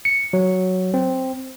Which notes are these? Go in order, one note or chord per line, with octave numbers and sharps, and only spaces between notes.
C#7
F#3
C4